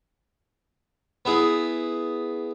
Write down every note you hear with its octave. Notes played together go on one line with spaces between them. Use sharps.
B3 E4 G#4